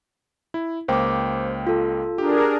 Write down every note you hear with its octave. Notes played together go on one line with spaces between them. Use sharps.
E4
C#2 A#3 C5 G5 D6
F4 A4
D4 G4 G#4 A#4